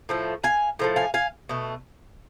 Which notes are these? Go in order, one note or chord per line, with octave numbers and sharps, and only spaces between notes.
A2 F3 A3
F5 G#5
A2 F3 A3
F5 G#5
F5 G#5
B2 A3